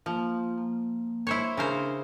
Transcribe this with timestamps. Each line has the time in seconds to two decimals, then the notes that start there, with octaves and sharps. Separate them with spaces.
0.06 F3 A#3 F4
0.58 A#3
1.27 E4 C5 C#5
1.57 C#3 D4 A#4 C5